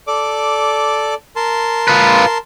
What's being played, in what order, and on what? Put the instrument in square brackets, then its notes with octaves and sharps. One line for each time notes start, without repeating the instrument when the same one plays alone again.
[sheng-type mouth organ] A4 D5 D6
A#4 A5 C6
[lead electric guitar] F4 B4